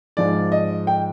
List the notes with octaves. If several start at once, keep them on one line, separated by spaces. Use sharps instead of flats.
G#2 F3 G#3 D5
D#5
G5